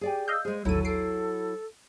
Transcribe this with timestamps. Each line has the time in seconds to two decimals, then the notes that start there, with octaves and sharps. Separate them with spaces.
0.01 G4 G#4 D5 G#5
0.28 D#5 F5 E6 G6
0.45 G#3 G#4 C5
0.65 A1 D#2 F#3 E4 F#4 A4 D#7
0.85 A4 C7 D7